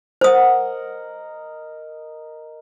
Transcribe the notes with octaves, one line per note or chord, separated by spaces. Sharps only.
A#4 C5 D#5 F#5 D#6